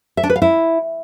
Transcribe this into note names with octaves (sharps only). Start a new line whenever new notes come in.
E5
D4
B4
F5
E4